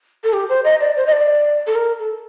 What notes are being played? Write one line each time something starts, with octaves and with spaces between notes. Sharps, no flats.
A4
G4
C5
D#5
D5
C5
D#5
D5
A4
A#4
A4